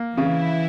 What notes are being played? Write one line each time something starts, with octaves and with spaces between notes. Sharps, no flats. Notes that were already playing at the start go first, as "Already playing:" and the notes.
Already playing: A#3
C#3 E3 E4